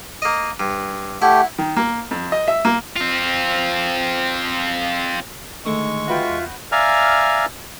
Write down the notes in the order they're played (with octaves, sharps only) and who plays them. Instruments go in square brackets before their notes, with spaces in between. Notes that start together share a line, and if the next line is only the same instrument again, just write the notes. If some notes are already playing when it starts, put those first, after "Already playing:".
[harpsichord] A#3 D#5
G2
[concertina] A3 G4 [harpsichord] E4 [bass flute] F#5
[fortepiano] D#3
A#3
F2
D#5
E5
A#3
[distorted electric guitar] C4 F4
[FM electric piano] D3 D#3 A3 [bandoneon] G#3 C#6
[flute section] F4 E5 [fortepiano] F#4 B4 G5
[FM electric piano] E2
[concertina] D5 E5 F5 G#5 A#5 F6